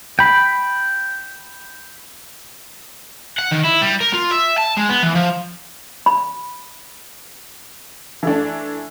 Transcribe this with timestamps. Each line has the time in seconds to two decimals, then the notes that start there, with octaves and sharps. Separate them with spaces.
0.19 G5 B5
3.38 F#5
3.51 D#3
3.64 E4
3.81 G3
4.00 A#4
4.13 F4
4.31 E5
4.58 A5
4.77 G#3
4.89 B3
5.03 E3
5.16 F3
6.06 B5
8.23 E3 A3 D4